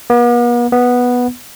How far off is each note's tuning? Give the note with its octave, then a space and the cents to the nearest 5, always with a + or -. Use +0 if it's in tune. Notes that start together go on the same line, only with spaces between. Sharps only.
B3 -45
B3 -5